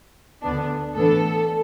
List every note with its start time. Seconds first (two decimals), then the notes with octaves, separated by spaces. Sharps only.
0.42 D2 D3 B3 D4
0.95 A2 E3 B3 D4 A4